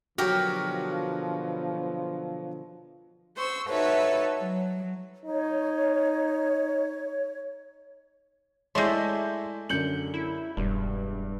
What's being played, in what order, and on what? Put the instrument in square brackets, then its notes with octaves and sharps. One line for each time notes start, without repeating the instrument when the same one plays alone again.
[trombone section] B2 D3 F3 [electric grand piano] F#3 F#4 [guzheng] G4 A#4
[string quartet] C5 C#6 E6
D#4 F#4 A4 B4 C#5 E5
F#3
[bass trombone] D#4 [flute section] C#5
[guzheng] G#3 A3 [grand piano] E4 D5 C6 [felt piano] C#5 E5 G6
[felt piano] F#2 D3 [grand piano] G6 C#7 F#7
[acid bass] E4
[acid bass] E1 [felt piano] G2